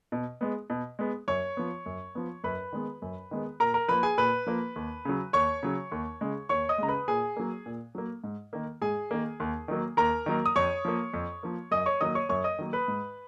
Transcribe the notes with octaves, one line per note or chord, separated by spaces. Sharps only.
B2
G#3 B3
B2
G#3 B3
F#2 C#5 C#6
F3 B3
F#2
F3 B3
F#2 B4 B5
D#3 G#3 B3
F#2
D#3 G#3 B3
A#2 A#4 A#5
A#4 A#5
F3 A#3 B4 B5
G#4 G#5
A#2 B4 B5
F3 A#3
D#2
C#3 F#3
D#2 C#5 C#6
C#3 F#3
D#2
C#3 G#3
D#2 C#5 C#6
D#5 D#6
C#3 G#3 A#5
B4 B5
A#2 G#4 G#5
F#3 A#3
A#2
F#3 A#3
G#2
D#3 A#3
G#2 G#4 G#5
D#3 A#3
D#2
D#3 F#3 A#3
D#2 A#4 A#5
D#3 F#3 A#3
D#6
F2 C#5 C#6
F3 A#3
F2
F3 A#3
F#2 D#5 D#6
C#5 C#6
D#3 F#3 A#3 D#5 D#6
C#5 C#6
F#2 C#5 C#6
D#5 D#6
D#3 F#3 A#3
B4 B5
G#2